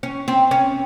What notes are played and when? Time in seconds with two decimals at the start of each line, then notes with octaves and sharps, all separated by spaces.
0.03 C#4
0.28 C4
0.51 C#4